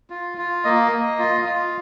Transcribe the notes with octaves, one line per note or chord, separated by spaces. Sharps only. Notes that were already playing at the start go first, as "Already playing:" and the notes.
F4
F4
A#3 D#5
A#3
F4
F4